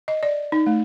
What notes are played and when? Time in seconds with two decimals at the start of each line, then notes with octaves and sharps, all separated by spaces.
0.08 D#5
0.23 D5
0.52 D#4
0.67 A3